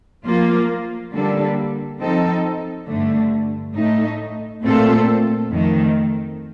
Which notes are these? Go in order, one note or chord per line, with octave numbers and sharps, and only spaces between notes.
F3 A#3 F4
D3 G3 A#3 D4 A4
F3 C4 D#4 A4
G2 D3 A3
A2 A3 D#4
A#2 A3 C4 F4 A4
F2 D#3 A3